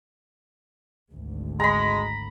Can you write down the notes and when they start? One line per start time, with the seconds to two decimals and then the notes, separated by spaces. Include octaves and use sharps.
1.13 G#1 D2
1.60 G#3 A#5 B5